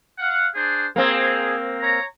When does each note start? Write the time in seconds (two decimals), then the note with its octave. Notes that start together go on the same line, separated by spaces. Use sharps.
0.19 F5 F#5
0.54 D4 G#4 C5
0.96 A#3 C4 G#4
1.80 C#5 A#5